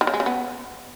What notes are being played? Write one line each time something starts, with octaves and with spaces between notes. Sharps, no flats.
D#3
C#3
G#3
C#3
B3